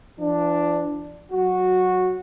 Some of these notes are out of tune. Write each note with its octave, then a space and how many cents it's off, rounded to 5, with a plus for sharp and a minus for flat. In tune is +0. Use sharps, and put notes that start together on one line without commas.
F3 -45 D4 +0
F#3 +0 F#4 -10